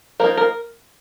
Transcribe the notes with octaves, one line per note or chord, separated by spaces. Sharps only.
F3 A#3 D#4 A#4
A#4